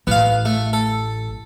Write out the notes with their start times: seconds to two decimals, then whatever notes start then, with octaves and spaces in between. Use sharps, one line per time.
0.07 A1 B3 F5
0.45 A3
0.73 A4